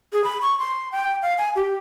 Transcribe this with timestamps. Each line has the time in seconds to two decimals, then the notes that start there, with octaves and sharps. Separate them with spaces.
0.13 G#4
0.24 B5
0.42 C#6
0.59 C6
0.92 G5
1.22 F5
1.38 G#5
1.56 G4